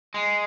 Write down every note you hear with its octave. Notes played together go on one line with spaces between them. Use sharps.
G#3